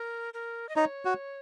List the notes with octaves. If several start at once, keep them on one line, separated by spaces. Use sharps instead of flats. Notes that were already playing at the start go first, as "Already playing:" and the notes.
Already playing: A#4
A#4
D#5
D#4 C#5
F#4